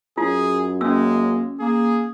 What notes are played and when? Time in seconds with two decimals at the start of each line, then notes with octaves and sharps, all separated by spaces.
0.18 F#2 F4 G#4
0.81 G#3 A#3 C#4 E6
1.60 A#3 G#4